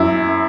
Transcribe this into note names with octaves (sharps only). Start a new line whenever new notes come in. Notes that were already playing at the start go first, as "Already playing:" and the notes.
Already playing: F#2 E4